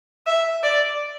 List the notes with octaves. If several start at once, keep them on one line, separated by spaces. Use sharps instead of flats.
E5
D5